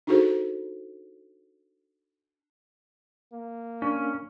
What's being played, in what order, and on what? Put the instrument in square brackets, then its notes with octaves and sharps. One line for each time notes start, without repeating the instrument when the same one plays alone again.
[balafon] D4 D#4 F#4 G#4 A4 C5
[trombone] A#3
[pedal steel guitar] C#4 [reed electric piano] D4